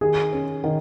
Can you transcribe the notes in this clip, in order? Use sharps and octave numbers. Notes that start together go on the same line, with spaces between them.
D#3 G#4
C#4
D#3